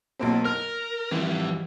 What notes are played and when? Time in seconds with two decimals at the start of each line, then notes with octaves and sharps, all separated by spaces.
0.19 B1 A#3 C4
0.45 A#4 F6
1.11 E3 F3 G3 C4